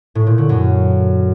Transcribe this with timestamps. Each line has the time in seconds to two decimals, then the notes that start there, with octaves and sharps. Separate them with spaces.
0.15 A2
0.27 A#2
0.38 D3
0.49 F#2